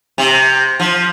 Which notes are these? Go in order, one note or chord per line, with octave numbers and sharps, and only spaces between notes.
C3
F3